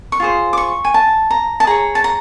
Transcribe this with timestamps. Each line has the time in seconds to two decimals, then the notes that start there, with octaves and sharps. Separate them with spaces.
0.12 C#6
0.20 F4 G#4 C5
0.53 D6
0.57 C#6
0.85 G#5
0.94 A5
1.30 A#5
1.60 A5
1.67 G#4 C#5 A#5
1.95 A5
2.04 A#5